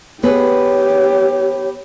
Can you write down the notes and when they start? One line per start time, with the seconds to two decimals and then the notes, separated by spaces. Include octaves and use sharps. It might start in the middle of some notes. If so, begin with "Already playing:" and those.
0.23 B3 G4 G#4 B4 C#5